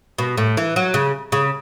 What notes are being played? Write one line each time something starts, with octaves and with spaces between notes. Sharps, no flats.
B2
A2
E3
F#3
C#3
C#3